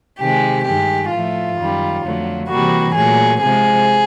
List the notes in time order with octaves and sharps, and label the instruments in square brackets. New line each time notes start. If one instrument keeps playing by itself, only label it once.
[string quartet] C3 D#3 G#3 G4
G2 D#3 G#3 G4
A2 F3 A3 F4
F#2 D#3 G3
F2 D3 F#3 A3
C3 E3 G3 A#3 F#4
A#2 F#3 A3 G#4
C3 F3 G#3 G#4